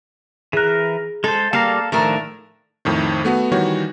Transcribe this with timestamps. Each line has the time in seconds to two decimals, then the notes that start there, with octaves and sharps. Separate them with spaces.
0.53 E3 G#4 A#4 F#6
1.24 G#3 A4 C5
1.53 G3 A#3 A4 F5 A#5
1.92 A2 D#3 F3 A3 D4 A#4
2.85 F2 A2 D#3
3.25 A3 B3 F#4
3.52 D#3 E3 G3 F#4 C#5